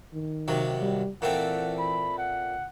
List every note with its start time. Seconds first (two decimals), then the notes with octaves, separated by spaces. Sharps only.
0.13 D#3
0.48 D#2 C3 F#3
0.82 G3
1.22 A#2 E3 A3 C4 F#5
1.79 B5
2.18 F#5